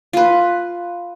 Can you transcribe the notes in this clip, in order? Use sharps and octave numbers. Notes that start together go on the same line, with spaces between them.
F4 B4